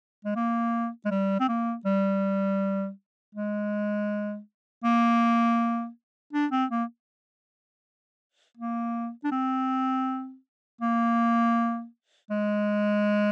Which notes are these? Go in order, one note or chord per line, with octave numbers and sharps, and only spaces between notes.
G#3
A#3
G#3
G3
C4
A#3
G3
G#3
A#3
D4
C4
A#3
A#3
D4
C4
A#3
G#3